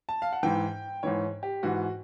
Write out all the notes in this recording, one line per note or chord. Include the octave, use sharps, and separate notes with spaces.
A5
F5
F#5
G#2 E3 G5
G#2 E3 C#5
G4
G#2 E3 F#4